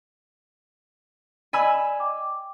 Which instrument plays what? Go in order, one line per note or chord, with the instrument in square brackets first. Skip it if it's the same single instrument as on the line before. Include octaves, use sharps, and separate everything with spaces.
[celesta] D5 D#5 [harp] G#5 B5 E6
[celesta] G5 D6